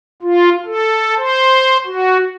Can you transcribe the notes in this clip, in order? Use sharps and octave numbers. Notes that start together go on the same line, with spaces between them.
F4
A4
C5
F#4